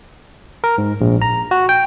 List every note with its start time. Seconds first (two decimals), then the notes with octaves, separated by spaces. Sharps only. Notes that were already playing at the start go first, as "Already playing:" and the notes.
0.64 A#4
0.78 G#2
1.01 A#1
1.22 A#5
1.51 F#4
1.69 G5